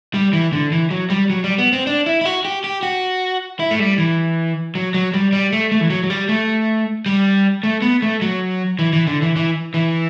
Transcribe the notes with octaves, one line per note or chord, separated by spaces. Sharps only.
G3
E3
D3
E3
F#3
G3
F#3
G3
B3
C4
D4
E4
E4
F#4
G4
G4
F#4
E4
A3
G3
E3
F#3
F#3
G3
G3
A3
A3
E3
F#3
F#3
G3
A3
G3
A3
B3
A3
F#3
E3
E3
D3
E3
E3
E3